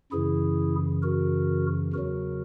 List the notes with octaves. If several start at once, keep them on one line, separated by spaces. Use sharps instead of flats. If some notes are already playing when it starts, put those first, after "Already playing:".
F#2 C#3 E3 E4 G#4
F#4 A#4
E2 C#3 F#3 F#4 A#4